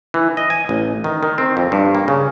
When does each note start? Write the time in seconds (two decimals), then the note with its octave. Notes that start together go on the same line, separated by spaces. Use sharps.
0.14 E3
0.37 D#5
0.50 G#5
0.69 A1
1.04 D#3
1.23 D#3
1.38 C4
1.57 F2
1.72 G2
1.95 A#3
2.08 C#3